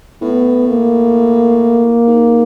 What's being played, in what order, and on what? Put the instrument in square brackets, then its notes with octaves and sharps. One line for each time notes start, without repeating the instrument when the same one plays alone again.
[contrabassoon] A2 [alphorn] B3
[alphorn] A#3
[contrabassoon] G#2